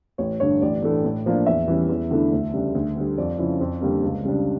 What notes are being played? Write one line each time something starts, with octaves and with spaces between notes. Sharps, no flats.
A1 C#5
G2 D3 C#5
A1 D5
A2 E3 A3 D4
A2
F3 A#3 D4
E2 E5
E3 G3 C#4
E2
D3 A3 E4
D2
C#3 G3 D4
D2
D3 G3
F2 D5
C#3 F3 C#4 E4
F2
D3 G3 A#3
C#2
C#3 G3 D4